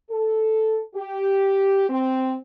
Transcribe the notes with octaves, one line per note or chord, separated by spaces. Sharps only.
A4
G4
C4